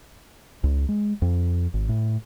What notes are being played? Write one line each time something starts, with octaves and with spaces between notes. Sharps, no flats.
C#2
G#3
F2
G#1
A2